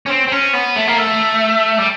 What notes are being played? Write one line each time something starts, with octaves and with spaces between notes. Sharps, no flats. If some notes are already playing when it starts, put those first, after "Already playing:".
C#4
C4
C4
C#4
B3
A3
A#3
A3
G3